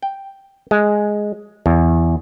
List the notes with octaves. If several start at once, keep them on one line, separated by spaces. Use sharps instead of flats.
G5
G#3
E2